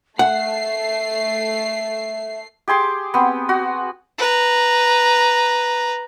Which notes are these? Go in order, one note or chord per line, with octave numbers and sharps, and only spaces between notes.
A3 E5 F#5 C7
G4 G#4 C6 D6
B3 C4
F#4
B4 A#5